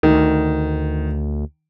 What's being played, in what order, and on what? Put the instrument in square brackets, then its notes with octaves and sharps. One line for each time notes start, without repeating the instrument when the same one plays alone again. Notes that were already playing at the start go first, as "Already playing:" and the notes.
[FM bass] D2 [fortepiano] D#3